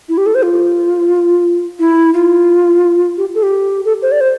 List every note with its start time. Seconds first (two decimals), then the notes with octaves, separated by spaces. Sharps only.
0.09 E4
0.18 G4
0.26 A4
0.35 C5
0.43 F4
1.80 E4
2.14 F4
3.18 G4
3.35 A4
3.43 G4
3.85 A4
4.02 C5
4.12 D5
4.21 C5